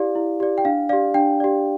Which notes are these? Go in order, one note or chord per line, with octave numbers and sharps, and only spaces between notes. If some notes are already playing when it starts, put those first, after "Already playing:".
Already playing: E4 G4 D5 F5
E4
G4 D5
G5
D4 F5
G4 D5 F5
D4 G5
G4 D5